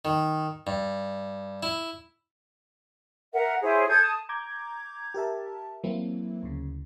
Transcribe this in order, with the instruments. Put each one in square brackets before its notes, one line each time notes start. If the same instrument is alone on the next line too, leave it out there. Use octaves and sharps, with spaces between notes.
[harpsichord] D#3
G2
E4
[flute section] A#4 E5 F#5
E4 G#4 C5 C#5
A4 D#6 G6 G#6
A5 D#6
[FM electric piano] A#5 D6 G6 G#6
G4 A#4 E5 A5
E3 F#3 A#3 C4 E4
D2 C#3